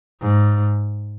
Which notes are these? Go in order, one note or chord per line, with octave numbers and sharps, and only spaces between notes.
G#2